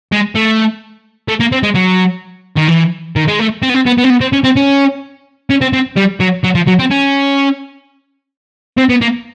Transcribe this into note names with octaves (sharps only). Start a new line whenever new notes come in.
G#3
A3
A3
A#3
C4
G#3
F#3
D#3
E3
D#3
G#3
A3
C4
B3
C4
B3
B3
C4
B3
C4
C#4
C4
C#4
C#4
C4
C4
G3
F#3
F#3
F3
F#3
C4
C#4
C4
B3
A#3